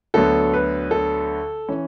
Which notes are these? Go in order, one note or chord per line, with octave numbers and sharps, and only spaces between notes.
D2 D3 F#3 B3 A4
B4
A4
E3 C#4